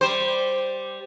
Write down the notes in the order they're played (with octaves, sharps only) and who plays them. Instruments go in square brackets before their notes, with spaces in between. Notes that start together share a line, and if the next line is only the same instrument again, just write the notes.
[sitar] G3 C5